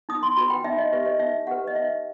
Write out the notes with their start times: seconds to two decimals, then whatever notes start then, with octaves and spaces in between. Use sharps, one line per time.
0.09 D#4 D#6
0.23 C6
0.37 F#4 B4 B5
0.50 G5
0.64 D#4 E5
0.78 D#5
0.92 G4 B4 E5
1.06 D#5
1.19 D#4 E5
1.47 G4 B4 F#5
1.67 D#5
1.75 D#4 E5